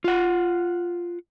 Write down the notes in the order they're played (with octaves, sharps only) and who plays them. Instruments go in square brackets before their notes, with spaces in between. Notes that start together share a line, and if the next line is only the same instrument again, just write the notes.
[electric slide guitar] F4 F#5